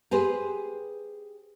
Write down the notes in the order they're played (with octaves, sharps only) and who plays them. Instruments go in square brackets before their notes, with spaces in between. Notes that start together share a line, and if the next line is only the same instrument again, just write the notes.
[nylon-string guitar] G4 G#4 B4 C5